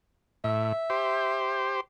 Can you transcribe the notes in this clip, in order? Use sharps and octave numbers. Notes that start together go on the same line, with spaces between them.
A2 E5
G4 C5